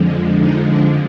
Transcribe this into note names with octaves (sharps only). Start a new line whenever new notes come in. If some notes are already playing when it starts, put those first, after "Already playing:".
Already playing: F2 D3 F3 G#3
D#4
D4